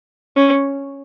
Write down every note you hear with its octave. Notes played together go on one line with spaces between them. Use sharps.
C#4